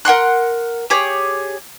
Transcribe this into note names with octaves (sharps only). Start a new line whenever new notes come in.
A#4 F#5 C6 F#6
G4 G#4 C#5